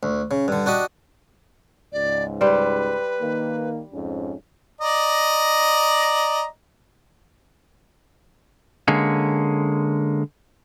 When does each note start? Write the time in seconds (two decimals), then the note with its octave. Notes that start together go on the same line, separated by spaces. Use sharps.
0.03 D2
0.31 C#3
0.48 G2 D3
0.66 D4 F#4 G4 D#5
1.93 C#2 G#2 D5
2.41 G3 B4 C5
3.20 D#3 A#3
3.92 F2 G#2 C#4
4.81 D5 D#5 A#5
8.88 D3 G#3 A#3 C#4